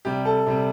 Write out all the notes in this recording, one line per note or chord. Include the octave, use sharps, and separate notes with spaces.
C3 G3 G4
A4
C3 G3